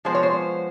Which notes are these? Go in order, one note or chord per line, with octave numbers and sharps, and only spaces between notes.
F3 G#3 B3 C5
C#5
C5